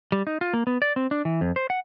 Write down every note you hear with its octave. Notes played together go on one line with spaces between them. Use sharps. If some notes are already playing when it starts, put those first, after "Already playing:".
G3
D#4
F4
A#3
B3
D5
C4
D4
E3
F2
C5
F#5